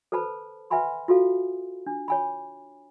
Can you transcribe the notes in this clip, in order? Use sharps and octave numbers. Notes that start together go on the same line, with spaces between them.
A4 B4 C5 A5 B5
B4 E5 F#5 G#5 B5 C6
F4 F#4 A4 F5
D4
C#5 G#5 B5